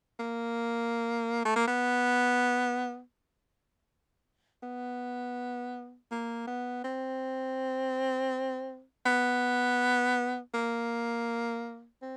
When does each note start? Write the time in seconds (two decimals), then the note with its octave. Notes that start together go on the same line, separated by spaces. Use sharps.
0.19 A#3
1.45 A3
1.56 A#3
1.67 B3
4.63 B3
6.11 A#3
6.47 B3
6.84 C4
9.06 B3
10.54 A#3
12.02 C4